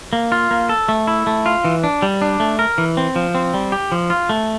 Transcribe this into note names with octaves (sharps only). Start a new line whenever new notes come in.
A#3
F4
A#3
A4
A3
E4
A3
F4
E3
D4
G3
D4
A3
A#4
E3
C4
F3
C4
G3
G4
F3
F4
A3